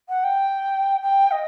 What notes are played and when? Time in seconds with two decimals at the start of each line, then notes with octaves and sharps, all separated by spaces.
0.09 F#5
0.23 G5
1.01 G5
1.31 D#5